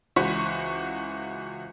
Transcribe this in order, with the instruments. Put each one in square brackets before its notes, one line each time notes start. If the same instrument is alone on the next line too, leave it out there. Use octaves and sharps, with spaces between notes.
[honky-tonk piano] C#2 E3 F#4 C5 C#6 B6